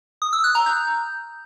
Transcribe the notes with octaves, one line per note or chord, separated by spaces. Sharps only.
D#6
E6
F#6
A#5
G6